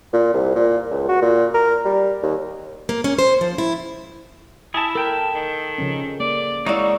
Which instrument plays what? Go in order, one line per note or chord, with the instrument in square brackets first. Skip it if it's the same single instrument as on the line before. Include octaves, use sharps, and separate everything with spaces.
[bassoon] A#2
C2
A#2
C#2
F#4
A#2
A#4
G3
D#2
[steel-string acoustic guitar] A#3
C#4
C5
F3
E4
[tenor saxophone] E4 [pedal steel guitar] G#4 A5
[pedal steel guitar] A4 G5 A5 [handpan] A#4
[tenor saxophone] D#3
[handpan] C#3 F3 C#4
[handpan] A#3 [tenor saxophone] D5
[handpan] G#3 E4 [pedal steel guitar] D#4 F#4 E5 [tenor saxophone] C#5 [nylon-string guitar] D5 F5